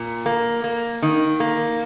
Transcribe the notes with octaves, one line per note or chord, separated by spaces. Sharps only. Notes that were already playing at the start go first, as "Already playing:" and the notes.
Already playing: A#2
A#3
A#3
D#3
A#3